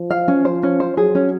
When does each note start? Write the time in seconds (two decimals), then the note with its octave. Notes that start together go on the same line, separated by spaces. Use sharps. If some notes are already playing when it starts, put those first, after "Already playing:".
Already playing: F3
0.10 F5
0.28 C#4
0.45 F3 C5
0.63 C#4
0.80 C5
0.97 F#3 G#4
1.15 C#4